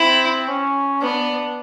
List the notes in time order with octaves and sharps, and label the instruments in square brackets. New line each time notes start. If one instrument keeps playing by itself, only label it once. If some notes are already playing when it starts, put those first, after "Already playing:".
Already playing: [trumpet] C4 [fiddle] E4
[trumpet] C#4
[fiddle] B3 [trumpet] D4